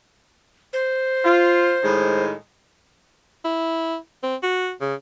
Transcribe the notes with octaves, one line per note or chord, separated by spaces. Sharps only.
C5
F4
A2 D#3 G#3
E4
C4
F#4
C#3